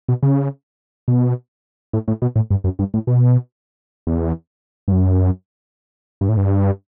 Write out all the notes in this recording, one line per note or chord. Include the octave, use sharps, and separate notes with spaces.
B2
C#3
B2
A2
A2
B2
A2
G2
F#2
G2
A2
B2
E2
G2
F#2
G2
A2
G2